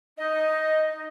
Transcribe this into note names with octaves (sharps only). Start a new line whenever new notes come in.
D#4 D#5